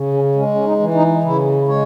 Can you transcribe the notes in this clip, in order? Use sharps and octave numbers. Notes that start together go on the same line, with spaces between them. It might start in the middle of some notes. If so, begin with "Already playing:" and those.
Already playing: C#3
C#4
G#3 C#4
C#4
D#4
E3
D#4
C#3 E4
G#3 C#5